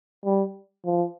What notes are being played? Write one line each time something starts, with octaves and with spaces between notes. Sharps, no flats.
G3
F3